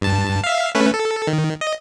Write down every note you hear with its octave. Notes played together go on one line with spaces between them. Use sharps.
G2 A5
E5 F5
A3 C#4 B4
A4
D#3
D#5